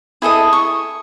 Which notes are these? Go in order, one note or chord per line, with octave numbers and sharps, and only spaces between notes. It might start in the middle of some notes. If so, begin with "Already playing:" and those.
E4 G#4 A4 D#5
C#6